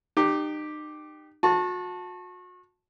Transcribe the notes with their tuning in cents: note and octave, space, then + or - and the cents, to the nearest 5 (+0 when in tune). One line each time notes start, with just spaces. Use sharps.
D#4 -35 G4 +0
F#4 -35 A5 +0